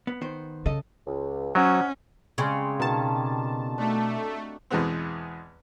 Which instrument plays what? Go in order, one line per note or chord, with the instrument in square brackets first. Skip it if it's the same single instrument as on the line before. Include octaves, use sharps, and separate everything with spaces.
[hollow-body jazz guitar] B3
D#3 B3 C5
[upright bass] C#3 [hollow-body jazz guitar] A4 D#5
[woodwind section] C#2
[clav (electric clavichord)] F#3 [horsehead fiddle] C#4 [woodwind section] C5 D#5 F#5
[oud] C#3 [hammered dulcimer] G3 G#3 C4
[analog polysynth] B2 A5 [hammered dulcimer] D#3 G4
[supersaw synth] A3 [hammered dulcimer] D4 F#4
[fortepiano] E2 B2 E3 G#3 B3 C4